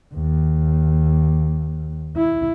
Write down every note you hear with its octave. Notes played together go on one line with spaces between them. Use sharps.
D#2
E4